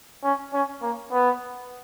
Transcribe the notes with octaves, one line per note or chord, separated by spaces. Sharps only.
C#4
C#4
A#3
B3